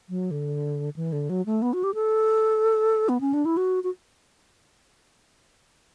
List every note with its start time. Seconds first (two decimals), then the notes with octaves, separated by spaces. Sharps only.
0.09 F#3
0.31 D3
0.96 E3
1.12 D3
1.30 F#3
1.46 A3
1.62 B3
1.73 F#4
1.84 G4
1.94 A4
3.09 B3
3.21 C#4
3.34 D4
3.45 E4
3.57 F#4
3.84 F#4